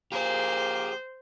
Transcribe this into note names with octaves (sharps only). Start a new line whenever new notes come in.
C#3 F3 A#3 G4 G#4 C5